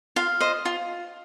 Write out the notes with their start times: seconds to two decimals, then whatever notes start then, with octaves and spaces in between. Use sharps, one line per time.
0.16 F4 F5
0.40 C5 D#5
0.65 F4